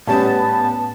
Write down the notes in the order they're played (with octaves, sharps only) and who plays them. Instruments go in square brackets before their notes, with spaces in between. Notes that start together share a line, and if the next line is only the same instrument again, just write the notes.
[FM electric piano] A2 [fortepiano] G3 C#4 [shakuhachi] B3 [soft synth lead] A5